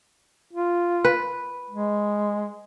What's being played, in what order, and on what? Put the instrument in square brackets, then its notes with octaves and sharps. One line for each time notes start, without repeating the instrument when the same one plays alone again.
[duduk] F4
[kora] B4
[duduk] G#3